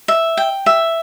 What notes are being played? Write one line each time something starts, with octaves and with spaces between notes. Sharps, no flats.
E5
G5
E5